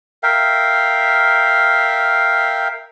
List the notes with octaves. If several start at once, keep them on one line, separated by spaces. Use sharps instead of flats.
A#4 E5 F5 G5